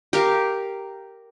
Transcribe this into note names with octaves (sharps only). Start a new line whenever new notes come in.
G4 A#4 F5